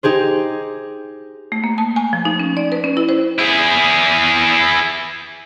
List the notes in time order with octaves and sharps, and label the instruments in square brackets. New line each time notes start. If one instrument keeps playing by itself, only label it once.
[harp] D#4 G4 G#4 C5
[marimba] A3
A#3
A5
G#5
F3
D#4
C#4
D5
B4
C#4
E4
C5
[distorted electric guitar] E4 G#4